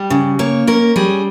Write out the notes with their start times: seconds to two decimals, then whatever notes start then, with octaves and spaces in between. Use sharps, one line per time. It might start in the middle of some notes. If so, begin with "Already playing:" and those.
Already playing: G3 G4
0.10 C#3
0.39 A#3 C#5
0.67 C#4 A#4
0.96 G3 G#4